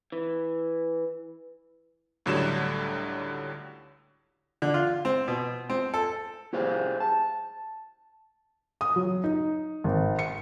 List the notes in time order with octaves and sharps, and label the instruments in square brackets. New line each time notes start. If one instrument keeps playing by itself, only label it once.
[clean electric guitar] E3
[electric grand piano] C#2 A2 D3 F#3 G3 E7
[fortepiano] D3
F4
C4
B2
C4
A4
[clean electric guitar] E4 G4 G#4 C5 F5
A5
[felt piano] D#6
F#3
D#4
G#1
C#7